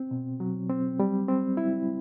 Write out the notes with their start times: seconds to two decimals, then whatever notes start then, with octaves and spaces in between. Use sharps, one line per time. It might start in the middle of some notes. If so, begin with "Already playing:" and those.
Already playing: C4
0.11 B2
0.40 F#3
0.70 C4
1.00 G3
1.28 C4
1.57 E4